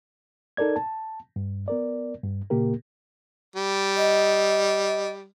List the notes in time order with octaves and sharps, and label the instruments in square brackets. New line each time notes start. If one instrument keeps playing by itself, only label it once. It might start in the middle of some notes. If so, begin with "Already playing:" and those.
[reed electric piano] D#4 A4 A#4 D5 G#6
A5
G2
B3 A#4 D5
G2
A#2 C#3 A#3 G4 A#4
[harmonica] G3
[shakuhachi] D#5